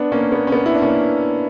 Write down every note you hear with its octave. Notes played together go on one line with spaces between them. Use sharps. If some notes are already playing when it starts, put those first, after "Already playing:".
Already playing: B3 D4
A#3 C#4
B3
C#4
B3
E4
D4
A#3 C#4